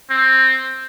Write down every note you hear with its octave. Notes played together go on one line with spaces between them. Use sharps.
C4